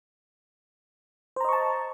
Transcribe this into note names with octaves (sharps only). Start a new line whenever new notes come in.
C5 D#5 A5 A#5 C#6